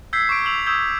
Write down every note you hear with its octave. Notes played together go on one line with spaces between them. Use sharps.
E6 G6 G#6 B6 C7
C#6 D6 C7 D7
C#6 E6 F7 F#7
C#6 D#6 E6 G6 G#6